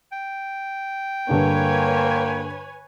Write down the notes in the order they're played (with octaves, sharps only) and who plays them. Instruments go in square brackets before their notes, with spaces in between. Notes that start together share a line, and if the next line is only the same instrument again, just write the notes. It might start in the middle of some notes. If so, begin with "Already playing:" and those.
[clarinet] G5
[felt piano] G2 D3 D4 [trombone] A#3 [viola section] B4 C#5 G#5